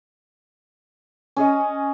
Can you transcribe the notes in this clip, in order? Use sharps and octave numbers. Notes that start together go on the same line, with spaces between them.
C#4 G#4 D#5